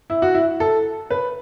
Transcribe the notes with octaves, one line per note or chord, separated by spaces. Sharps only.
E4
F#4
E4
A4
B4